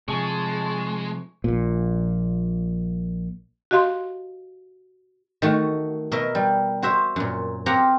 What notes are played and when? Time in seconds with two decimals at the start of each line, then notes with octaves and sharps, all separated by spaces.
0.08 C3 F3 G#3 G#5 A5 C#6
1.44 A#1 A#2
3.71 F#4 G4 D#5 F5 C6
5.42 D#3 A3 F#4
6.12 B2 A#4 D#5 E5
6.35 G3
6.82 F#4 C5 E5
7.16 F#2 A#2
7.66 C4 G4 F5 F#5 A#5